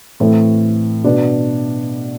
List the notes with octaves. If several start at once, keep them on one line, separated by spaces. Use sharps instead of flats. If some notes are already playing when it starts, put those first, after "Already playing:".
A2 E3 A3 C4
B2 B3 D4